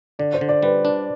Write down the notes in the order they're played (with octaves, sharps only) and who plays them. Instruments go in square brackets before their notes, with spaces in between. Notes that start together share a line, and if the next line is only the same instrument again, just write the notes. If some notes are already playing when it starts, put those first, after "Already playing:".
[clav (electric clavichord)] D3 [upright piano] D5
[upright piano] C5
[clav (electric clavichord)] D3
[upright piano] D5
[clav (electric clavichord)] G3 [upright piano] B4
[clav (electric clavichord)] D4